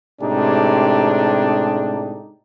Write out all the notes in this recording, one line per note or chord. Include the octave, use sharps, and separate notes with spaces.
A2 C3 G#3 D4 D#4 G4